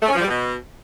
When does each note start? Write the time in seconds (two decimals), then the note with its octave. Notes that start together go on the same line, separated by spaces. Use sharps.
0.02 A3
0.08 C#4
0.15 F3
0.21 G3
0.28 B2